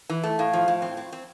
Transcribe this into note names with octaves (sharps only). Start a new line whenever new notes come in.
E3
A3
A2 F5
F3
A2
C4
C4
C4